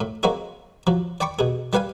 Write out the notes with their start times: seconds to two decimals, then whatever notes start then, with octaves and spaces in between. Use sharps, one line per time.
0.01 A2
0.23 F#3 A#3 C4 D#4 F#4 G#4
0.87 F3 F#3
1.20 D5 G5 B5 C#6 D6
1.39 B2 G#4
1.73 G3 G4 B4 F5 G#5